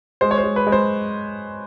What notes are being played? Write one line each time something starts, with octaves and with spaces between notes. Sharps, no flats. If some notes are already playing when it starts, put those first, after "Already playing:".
G#3 C5
C#5
C5
G#3
B4
G#3
C5